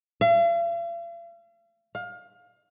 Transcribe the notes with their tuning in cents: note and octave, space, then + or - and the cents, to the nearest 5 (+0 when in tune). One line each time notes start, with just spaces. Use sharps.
F5 -45
F5 +25